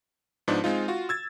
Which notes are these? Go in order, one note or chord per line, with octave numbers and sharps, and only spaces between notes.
G#2 F3 B3 D4 D#4
G#3 C4 D#4 F4
F4 F#4
E6 G#6 A6